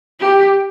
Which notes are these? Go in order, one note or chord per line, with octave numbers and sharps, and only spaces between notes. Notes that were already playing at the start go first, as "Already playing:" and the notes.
G4